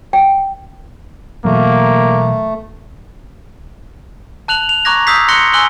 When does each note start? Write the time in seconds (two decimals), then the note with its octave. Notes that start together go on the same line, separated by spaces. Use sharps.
0.13 G5
1.45 B2 E3 F#3 A3 A#3
4.48 A5 F#6 F7 F#7
4.69 F7
4.85 A#5 C#6 D6 F#6 G#6 A#6
5.07 D#6 E6 G6 G#6 B6 C7
5.28 C6 F#6 A#6 C#7 G7
5.53 G#5 C6 E6 F#6 F#7 G7